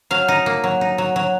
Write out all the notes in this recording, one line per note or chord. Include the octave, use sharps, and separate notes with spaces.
F#3 F5
D#4
A#3
F#3
D#4
F#3
F#3